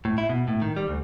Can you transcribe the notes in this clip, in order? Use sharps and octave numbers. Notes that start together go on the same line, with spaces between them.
A2
E4
B2
A2
D#3
G3
D2